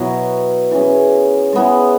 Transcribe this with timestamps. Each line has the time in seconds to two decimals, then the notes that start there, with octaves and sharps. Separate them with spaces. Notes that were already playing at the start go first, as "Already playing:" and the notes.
Already playing: B2 F#3 B3 E4
0.71 E3 C#4 G#4
1.53 G#3 B3 E4